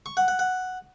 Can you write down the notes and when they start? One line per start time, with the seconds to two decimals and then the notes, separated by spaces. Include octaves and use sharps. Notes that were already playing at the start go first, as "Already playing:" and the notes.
0.06 C#6
0.17 F#5
0.28 F#5
0.39 F#5